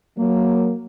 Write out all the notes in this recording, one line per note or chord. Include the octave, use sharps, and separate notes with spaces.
F#3 A#3